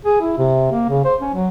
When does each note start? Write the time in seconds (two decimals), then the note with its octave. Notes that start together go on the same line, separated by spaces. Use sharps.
0.05 G#4
0.21 E4
0.38 C3
0.72 A#3
0.89 C#3
1.05 C5
1.21 C#4
1.34 F#3